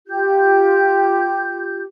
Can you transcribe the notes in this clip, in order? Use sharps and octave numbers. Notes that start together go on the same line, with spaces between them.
F4 G4 G6